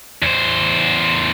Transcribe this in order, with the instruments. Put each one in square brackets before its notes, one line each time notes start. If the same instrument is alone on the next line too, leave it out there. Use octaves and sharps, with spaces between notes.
[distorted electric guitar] E2 C5